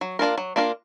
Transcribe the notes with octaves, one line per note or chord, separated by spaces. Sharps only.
F#3
A#3 D4 F4 A#4
F#3
A#3 D4 F4 A#4